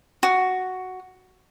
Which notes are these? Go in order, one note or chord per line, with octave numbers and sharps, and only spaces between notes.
F#4